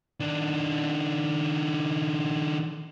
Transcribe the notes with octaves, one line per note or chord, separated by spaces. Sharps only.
D#3 D4